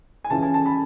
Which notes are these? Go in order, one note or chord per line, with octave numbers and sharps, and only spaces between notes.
G#5
C#2 C#3 E3 A5
G#5
A5
B5